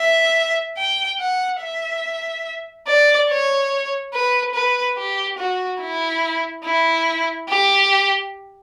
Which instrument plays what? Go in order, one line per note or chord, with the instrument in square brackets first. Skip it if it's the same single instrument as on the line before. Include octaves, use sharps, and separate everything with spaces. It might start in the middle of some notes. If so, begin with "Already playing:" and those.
Already playing: [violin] E5
G5
F#5
E5
D5
C#5
B4
B4
G4
F#4
E4
E4
G4